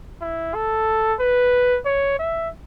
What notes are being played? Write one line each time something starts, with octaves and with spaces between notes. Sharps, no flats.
E4
A4
B4
C#5
E5